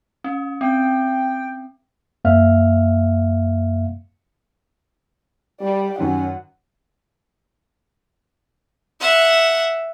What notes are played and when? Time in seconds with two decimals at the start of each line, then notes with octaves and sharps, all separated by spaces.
0.24 C#4
0.61 C4 G5
2.25 F#2 A#3 E5 F5 F6
5.60 G3 G4 D5
5.99 F#2 D#3 C#4 F#5
9.00 E5 F#5